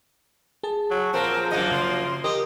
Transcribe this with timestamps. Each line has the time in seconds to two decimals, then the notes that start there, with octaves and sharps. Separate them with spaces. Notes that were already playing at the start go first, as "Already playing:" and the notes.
0.63 G#4 A5
0.91 F#3
1.14 A#2 F3 C4 A#4
1.52 F#2 A#3 D#5 F#5
1.72 C#3 C6
2.24 G4 A#4 D#5